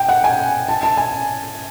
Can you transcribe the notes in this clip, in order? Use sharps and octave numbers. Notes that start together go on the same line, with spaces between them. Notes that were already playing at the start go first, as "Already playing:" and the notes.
Already playing: G5
F#5
G#5
A5
A5
G#5